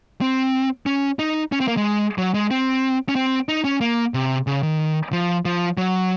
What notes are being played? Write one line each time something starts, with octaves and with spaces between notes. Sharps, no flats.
C4
C#4
D#4
C#4
C4
A#3
G#3
F#3
G#3
C4
C#4
C4
D#4
C#4
A#3
C3
C#3
D#3
F3
F3
F#3